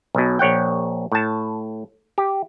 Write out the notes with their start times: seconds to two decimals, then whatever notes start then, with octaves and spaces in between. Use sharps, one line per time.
0.15 B1 B2
0.39 A#1 C#5 F#5 G5
1.12 A2 A5
2.18 G4